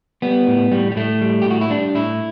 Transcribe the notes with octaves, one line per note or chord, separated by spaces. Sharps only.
G3 B3
A2
A2 G3
G3
A2 A3
G3
G4
A2 F#4
E4
G3 D4
A2 E4